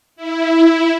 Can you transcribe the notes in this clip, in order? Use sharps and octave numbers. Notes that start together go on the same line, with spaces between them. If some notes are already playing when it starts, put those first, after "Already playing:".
E4